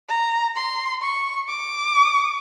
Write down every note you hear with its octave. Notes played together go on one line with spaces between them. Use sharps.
A#5
C6
C#6
D6